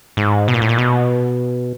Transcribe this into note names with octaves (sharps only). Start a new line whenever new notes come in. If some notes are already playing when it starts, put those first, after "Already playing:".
G#2
B2
A#2
A2
A#2
B2